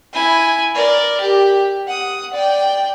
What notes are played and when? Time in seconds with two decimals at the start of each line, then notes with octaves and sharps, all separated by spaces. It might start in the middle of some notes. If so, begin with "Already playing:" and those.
0.13 E4 G#5
0.75 A#4 D5
1.21 G4
1.87 F#5 D#6
2.33 D5 G5